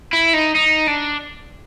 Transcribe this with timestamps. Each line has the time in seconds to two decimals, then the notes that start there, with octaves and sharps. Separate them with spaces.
0.13 E4
0.34 D#4
0.55 D#4
0.88 D4